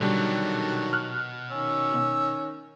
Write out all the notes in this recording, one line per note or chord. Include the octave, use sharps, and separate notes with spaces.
B2 D3 D#3 F#3 G3 D4 A5
F6 F#6
D#3 C#4 E6